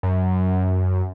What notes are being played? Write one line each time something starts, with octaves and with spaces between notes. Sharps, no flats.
F#2